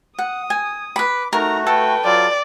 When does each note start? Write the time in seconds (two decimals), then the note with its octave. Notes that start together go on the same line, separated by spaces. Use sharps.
0.18 F#5 D#6
0.50 G#5
0.96 B4 B5 D6
1.33 A3 D#4 F#4 A#4 A#5
1.67 A4 B4 G5
2.05 F#3 F4 D5